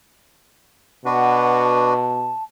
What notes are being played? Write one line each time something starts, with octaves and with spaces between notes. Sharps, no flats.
B2 D4 F#4 B4 F#5
A5